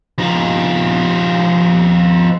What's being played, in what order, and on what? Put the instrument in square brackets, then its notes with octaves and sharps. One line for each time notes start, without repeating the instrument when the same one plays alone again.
[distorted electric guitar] F3 D#4